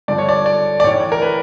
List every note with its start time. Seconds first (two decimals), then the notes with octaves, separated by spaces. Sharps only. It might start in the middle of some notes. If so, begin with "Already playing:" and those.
0.08 G2 D3 F3 D5
0.18 C#5
0.29 D5
0.46 D5
0.80 D5
0.84 A2 E3 C#5
1.12 A#4
1.22 B4